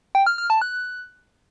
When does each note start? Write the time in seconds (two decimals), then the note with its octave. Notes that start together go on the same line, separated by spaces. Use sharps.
0.15 G5
0.26 F6
0.38 F6
0.50 A5
0.62 F#6